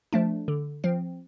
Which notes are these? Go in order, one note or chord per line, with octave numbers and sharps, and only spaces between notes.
F3 A3 D4
D3
F3 C4